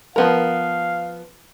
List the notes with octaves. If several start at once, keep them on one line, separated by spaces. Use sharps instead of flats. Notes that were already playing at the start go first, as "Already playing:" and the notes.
F3 B3 A#4 F5